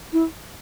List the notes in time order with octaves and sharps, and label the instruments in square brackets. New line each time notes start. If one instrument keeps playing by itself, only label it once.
[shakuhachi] E4